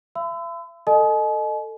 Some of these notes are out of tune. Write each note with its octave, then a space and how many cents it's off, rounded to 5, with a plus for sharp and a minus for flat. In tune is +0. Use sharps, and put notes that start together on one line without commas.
E5 +45 B5 +45 E6 +5
A4 +15 D#5 -20 G#5 +45